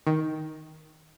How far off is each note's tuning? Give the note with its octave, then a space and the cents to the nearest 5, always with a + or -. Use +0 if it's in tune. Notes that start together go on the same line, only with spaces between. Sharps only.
D#3 +10